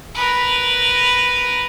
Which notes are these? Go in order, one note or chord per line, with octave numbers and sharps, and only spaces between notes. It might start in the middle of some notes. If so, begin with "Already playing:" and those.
A#4 B4